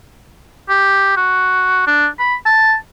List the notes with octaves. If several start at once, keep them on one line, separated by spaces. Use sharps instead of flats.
G4
F#4
D4
B5
A5